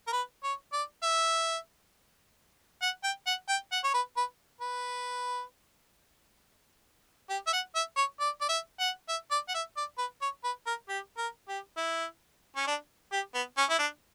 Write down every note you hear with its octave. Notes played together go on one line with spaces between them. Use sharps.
A#4
B4
C#5
D5
E5
F#5
G5
F#5
G5
F#5
C#5
B4
B4
B4
G4
E5
F#5
E5
C#5
D5
D5
E5
F#5
E5
D5
F#5
E5
D5
B4
C#5
B4
A#4
G4
A#4
G4
E4
C#4
D4
G4
B3
C#4
E4
D4